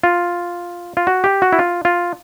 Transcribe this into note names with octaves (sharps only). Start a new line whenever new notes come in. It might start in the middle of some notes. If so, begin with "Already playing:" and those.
F4
F4
F#4
G4
F#4
E4
F4
F4